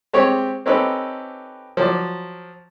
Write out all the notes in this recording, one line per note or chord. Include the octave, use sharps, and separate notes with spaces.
G#3 C4 G4 C#5
C4 C#4 D#4 G4 A4 B4
F3 F#3 D5